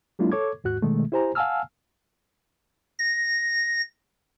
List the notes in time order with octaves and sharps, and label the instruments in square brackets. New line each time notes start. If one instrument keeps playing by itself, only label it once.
[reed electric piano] F#3 G#3 A#3 D4 E4 F4
A4 C#5 C#6 D6 G#6
D#2 G#2 F#4 F#6
B2 D#3 G#3 A3
E4 G4 C5 G#5 A#5
F5 F#5 G#5 A5 E6 F6
[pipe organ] A#6